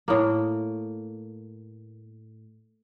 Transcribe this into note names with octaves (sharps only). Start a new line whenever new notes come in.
A2 A#3